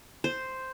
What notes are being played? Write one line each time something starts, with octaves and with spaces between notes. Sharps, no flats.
C5